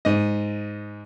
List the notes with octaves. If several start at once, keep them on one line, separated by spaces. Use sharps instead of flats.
G#2 D#5